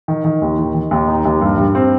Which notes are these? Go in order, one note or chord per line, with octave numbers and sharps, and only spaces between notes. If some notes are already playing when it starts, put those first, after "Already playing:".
D#3
D#3
D#2
D#3
D#3
D#2
D#4
D#2
G2
G2
C4